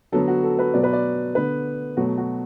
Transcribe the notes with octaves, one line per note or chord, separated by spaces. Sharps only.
D3 F#3 B3 A4
F#4
A4
B4
B2 F#3 B3 D5
B4
D5
D3 B3 B4
B2 F#3 A3 F#4
F#4